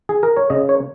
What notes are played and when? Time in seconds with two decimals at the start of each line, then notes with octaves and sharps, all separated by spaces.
0.09 G#4
0.23 A#4
0.37 C#5
0.50 C#3 D#5
0.69 C#5